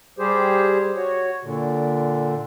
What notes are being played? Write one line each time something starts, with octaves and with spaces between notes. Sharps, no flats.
G3 G4 G#4 C5
F#4 C#5
A#2 D3